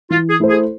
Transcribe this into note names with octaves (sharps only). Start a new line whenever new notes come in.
E3 F4
G#4
A3 E4 A4 C5
G#4